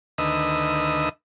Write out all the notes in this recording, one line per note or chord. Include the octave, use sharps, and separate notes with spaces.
D2 D#3 B4 D#5 E6